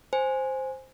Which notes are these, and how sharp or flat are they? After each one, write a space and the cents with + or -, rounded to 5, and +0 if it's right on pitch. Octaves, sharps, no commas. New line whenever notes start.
C5 +0 G#5 +0